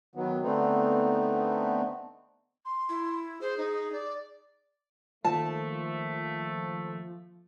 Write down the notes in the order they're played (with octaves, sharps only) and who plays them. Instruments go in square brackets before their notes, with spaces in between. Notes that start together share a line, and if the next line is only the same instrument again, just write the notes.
[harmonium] D#3 F#3 B3
D3 A3 B3 C4 D#4
[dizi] C6
[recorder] E4
[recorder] G#4 [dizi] C5
[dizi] D#4
D5
[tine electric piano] D#3 A#3 [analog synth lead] F3 [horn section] A3 [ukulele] A5